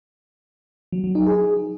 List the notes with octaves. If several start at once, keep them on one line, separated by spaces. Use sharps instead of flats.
F#3
F#3
D#4
G#4